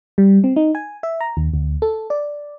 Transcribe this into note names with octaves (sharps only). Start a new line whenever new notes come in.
G3
C4
D#4
G#5
E5
A#5
D#2
D2
A4
D5